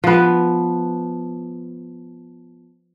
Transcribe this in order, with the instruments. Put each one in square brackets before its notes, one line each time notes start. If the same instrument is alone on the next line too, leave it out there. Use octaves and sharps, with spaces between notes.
[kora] F3 B3